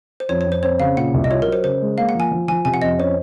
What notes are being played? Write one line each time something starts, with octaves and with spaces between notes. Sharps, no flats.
C5
F2 C#5
C#5
F2
C5
C4 C#5
C#3 F5
A#2 F#5
C2
D#5
F4 C#5
F#3 A#4
C5
C#3 C5
G#3
A#3 F5
F#5
F3 G#5
F3
F3 G#5
C3 G#5
F#5
F2 D#5
C#4 C5